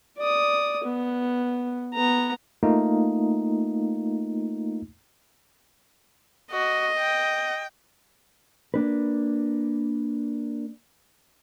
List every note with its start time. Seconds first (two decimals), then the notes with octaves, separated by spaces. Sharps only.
0.17 D5 D#6
0.84 B3
1.93 B3 A#5
2.63 A3 A#3 D#4 F4
6.52 F#4 D#5
6.99 G5
8.74 A#3 D4 B4